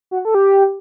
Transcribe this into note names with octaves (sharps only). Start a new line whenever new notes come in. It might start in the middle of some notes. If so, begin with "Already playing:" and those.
F#4
A4
G4